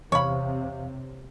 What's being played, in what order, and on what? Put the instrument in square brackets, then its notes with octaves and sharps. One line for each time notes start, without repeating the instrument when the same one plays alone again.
[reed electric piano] E2 F5 [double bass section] C3 [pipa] C#5 B5